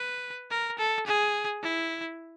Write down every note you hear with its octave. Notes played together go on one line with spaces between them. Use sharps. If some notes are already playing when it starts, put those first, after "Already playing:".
Already playing: B4
A#4
A4
G#4
E4